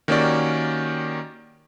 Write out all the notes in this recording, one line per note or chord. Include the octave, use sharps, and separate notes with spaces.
D#3 A#3 C#4 F#4 G4 D5